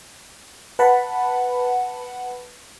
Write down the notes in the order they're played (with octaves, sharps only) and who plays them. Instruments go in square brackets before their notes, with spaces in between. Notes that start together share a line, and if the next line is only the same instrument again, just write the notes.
[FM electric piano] B4 F#5 A5 B5